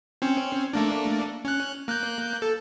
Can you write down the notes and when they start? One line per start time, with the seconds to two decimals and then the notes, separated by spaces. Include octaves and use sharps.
0.22 C4 C#4
0.73 A3 A#3 D4
1.45 C#4 F#6
1.88 A#3 F#6 G6
2.42 A4